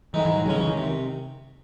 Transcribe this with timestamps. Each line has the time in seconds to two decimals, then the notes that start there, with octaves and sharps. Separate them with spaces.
0.14 G#2 D#3 E3 G#3 D#4
0.25 E3
0.35 F#3
0.46 C#2 C#3 F#3 G#3 C#4
0.56 E3
0.67 D#3
0.77 C3